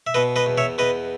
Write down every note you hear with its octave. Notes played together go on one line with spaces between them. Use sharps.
E5
B2 B4 D#5
B4 D#5
E2
C#5 E5
E2 B4 D#5